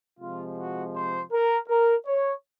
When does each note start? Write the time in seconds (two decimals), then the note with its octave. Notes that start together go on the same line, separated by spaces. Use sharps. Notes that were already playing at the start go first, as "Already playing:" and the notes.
0.19 C3 F3 G#3 F4
0.57 F#4
0.94 C5
1.31 A#4
1.68 A#4
2.06 C#5